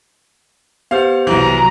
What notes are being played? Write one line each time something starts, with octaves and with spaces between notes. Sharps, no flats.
B3 G4 C5 F5
C2 E3 F#3 A#5